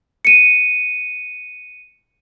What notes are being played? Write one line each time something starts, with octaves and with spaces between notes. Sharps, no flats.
C#7 D#7